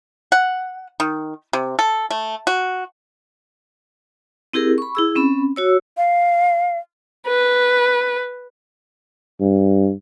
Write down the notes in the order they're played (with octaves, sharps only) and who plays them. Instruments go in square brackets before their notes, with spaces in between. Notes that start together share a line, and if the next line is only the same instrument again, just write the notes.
[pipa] F#5
D#3
C3
A4
A3
F#4
[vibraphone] C4 E4 G4 G#4 A#4
B5 C#6
E4 G#4 E6
C4 C#4 B5
F#4 C#5 E6
[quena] F5
[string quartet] B4
[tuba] G2